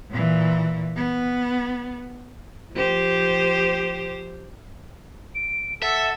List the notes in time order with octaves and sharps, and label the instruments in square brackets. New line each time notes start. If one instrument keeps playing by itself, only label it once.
[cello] A#2 E3
B3
[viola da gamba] F3 G4 C5
[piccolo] D7
[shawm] A4 [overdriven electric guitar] E5 [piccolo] F#5